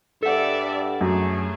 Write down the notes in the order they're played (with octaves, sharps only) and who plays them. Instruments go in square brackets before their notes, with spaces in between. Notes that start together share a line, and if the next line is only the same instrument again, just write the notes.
[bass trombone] G2 [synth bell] A4 F#5 [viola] D5 E5
[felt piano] F#2 [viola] A3 G#4